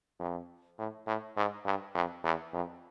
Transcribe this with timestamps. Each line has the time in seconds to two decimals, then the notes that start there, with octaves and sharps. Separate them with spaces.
0.20 F2
0.79 A2
1.07 A2
1.37 G#2
1.66 G2
1.95 F2
2.24 E2
2.54 F2